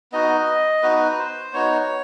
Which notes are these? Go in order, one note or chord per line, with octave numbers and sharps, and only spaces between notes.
B3 D#4 F#4 D#5
B3 D#4 F#4 B4
C5
B3 D#4 F#4 C#5